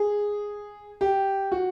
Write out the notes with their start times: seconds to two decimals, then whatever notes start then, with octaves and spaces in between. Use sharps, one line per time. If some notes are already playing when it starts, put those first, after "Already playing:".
Already playing: G#4
1.01 G4
1.52 F#4